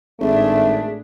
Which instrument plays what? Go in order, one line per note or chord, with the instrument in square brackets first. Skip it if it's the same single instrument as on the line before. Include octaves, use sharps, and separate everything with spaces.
[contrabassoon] G#1 [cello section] A2 D4 [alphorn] A3 [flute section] G#4 E5